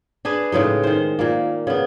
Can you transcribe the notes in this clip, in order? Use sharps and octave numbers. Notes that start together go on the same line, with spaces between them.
D4 G#4 B4
A2 C#3 G#3 D#4
D#3 C5
A#2 A#3
C#3 B3